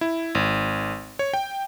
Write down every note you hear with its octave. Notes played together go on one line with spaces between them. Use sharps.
E4
G#1
C#5
G5